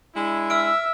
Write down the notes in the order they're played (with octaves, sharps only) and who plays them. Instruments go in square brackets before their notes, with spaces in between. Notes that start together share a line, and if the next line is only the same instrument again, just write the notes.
[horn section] G#3 D4 E4
[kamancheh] E5 [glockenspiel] E6 F6 D7